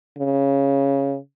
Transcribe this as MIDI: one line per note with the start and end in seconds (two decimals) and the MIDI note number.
0.18 1.17 49